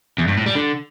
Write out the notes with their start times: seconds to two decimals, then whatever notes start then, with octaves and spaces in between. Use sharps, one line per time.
0.18 E2
0.28 G2
0.37 A2
0.46 G3
0.55 D3